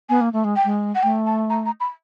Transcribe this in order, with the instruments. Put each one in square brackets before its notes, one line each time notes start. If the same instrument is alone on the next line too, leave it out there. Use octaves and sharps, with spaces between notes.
[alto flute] B3 [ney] G#5
[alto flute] A#3
A3
G#3
[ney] G5
[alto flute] G#3
[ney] F#5
[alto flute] A3 [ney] G5
[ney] A5
A#5
A#5
B5